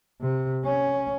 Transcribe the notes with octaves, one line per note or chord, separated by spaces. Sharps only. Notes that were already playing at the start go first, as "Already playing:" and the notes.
C3
C#4